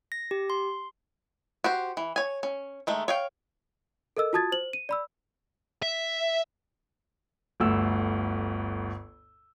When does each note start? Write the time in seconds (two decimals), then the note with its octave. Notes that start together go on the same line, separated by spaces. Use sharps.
0.12 A#6
0.31 G4
0.50 C6
1.64 F#4 G4 C5
1.97 E3
2.16 C#5 G#5
2.43 C#4
2.87 D#3 G#3 A3
3.08 C#5 F5 G5
4.17 A4 A#4 D#5 E6
4.33 F4 F#4 A5 D#6 G#6 A6
4.52 C5 F#7
4.73 D#7
4.89 D5 B5 E6
5.82 E5
7.60 G1 D2 E6